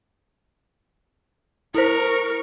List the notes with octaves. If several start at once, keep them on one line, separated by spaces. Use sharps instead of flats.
E4 A#4 C5 C#6